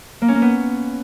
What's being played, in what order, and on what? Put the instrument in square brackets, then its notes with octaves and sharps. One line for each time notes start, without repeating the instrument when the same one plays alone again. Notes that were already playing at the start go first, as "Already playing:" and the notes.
[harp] A#3
C#4
A#3
B3